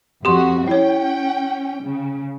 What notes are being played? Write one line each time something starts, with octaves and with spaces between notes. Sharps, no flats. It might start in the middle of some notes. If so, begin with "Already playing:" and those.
F2 F#4 G4 C6
C#4 E4 C#5 G5
C#3